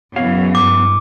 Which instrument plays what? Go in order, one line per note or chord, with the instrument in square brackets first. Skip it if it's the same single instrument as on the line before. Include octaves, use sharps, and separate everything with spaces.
[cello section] F#2 C#3 E3 [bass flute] B3 [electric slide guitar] F#4 C#5 F5
[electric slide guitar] G2 [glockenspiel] D6